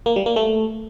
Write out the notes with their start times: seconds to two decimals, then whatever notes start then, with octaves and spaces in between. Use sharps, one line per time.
0.06 A#3
0.16 G3
0.26 A#3
0.36 A3